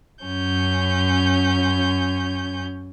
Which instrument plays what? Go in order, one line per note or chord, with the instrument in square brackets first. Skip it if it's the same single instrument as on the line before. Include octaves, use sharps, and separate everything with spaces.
[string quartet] F#2 C#4 G6